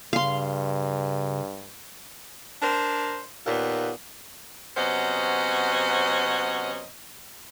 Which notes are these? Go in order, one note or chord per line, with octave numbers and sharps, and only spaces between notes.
G2 C#3 F5 C6
D4 A#4 C5
D#2 A#2 B3
C3 F#3 B3 C#4 C5 D#5